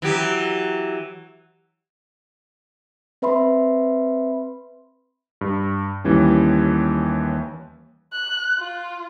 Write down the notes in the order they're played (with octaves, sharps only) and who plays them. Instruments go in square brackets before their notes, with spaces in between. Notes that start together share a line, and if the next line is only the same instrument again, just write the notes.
[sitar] E3 F#3 G4
[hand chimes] C4 B4 E5 B5 C6
[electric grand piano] G2
D#2 E3 G3 C#4
[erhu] F#6
F4